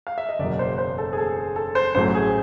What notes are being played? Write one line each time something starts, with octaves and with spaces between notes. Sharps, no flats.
F5
E5
D#5
F#1 E2 B2 F#3 A#3 D5
C5
C5
A4
G#4
A4
A4
C5
A1 A2 F#3 A3 C5
G#4